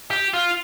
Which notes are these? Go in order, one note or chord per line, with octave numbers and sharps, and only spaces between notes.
G4
F4